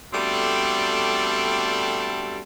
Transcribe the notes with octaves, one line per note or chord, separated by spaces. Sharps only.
B2 G3 A3 C4 D4 A4